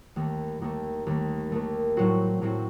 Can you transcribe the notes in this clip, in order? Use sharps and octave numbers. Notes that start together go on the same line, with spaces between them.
D#2 D#3 A3
D#2 D#3 A3
D#2 D#3 A3
D#2 D#3 A3
A2 F#3 C4 F#4
A2 F#3 C4 F#4